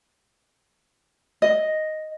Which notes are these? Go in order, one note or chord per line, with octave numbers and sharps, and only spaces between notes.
D#5